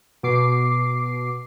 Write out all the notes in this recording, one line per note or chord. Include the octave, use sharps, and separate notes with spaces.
B2 D6 C7